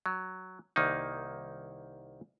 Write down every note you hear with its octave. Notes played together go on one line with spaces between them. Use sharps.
F#3
C2 D#3 A#3 D#4